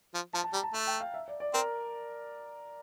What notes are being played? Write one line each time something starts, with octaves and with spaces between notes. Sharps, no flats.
F3
F3 A5
A5
G3 A#5
A5
A3 A5
G5
F5
E5
D5
D5
C4 A#4